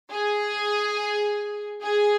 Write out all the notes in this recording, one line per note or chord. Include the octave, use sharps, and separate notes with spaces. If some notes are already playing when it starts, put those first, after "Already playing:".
G#4
G#4